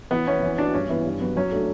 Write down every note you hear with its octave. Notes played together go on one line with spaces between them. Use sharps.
E3 B3
B3 C#4 E4
E3
B3 D4 F#4
G2 C#4
E3 B3 E4
G2
F#3 B3
F#3 C#4
A3 D4 F#4 A4